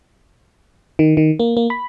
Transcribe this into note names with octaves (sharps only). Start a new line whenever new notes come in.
D#3
D#3
A#3
A#3
B5